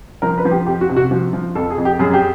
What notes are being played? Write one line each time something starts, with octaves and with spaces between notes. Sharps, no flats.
F3 A#4
B4
F3
G4
F2 G4
F#4
C3
F#4
F3
F3
F2 A4
G#4
F2
G4
F#2 G#4
G4